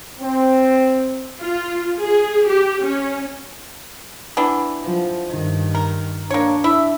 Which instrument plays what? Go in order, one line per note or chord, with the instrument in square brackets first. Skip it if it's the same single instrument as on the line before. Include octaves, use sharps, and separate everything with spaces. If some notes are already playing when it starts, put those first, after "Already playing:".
[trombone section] C4
[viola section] F4
G#4
G4
C#4
[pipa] E3 B3 D4
[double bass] F3
G2 D#3
[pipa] A#4
[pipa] A#3 C#5 [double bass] D4
[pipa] E4 E5